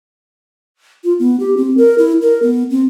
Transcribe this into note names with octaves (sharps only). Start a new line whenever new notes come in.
F4
B3
G4
C4
A#4
E4
A#4
B3
C4